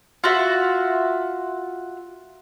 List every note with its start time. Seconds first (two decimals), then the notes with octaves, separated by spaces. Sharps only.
0.24 F4 F#4 E5